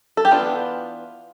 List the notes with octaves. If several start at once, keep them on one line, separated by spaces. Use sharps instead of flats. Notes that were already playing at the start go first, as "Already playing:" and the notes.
A4
G4
E3 B3 D4 F4